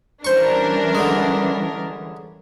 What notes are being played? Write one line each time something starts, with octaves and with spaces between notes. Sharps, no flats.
E3 G3 C#4 D4 A#4 C5 C#6
D3 G#3